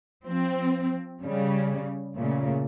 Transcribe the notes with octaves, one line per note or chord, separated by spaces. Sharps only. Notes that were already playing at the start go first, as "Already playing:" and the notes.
F3 C4
C#3 G3
A#2 C#3 A3